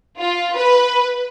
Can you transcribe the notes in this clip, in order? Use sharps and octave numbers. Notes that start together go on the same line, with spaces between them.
F4
B4